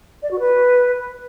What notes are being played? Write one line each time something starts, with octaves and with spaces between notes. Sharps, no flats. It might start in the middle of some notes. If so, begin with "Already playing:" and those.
D5
F#4
B4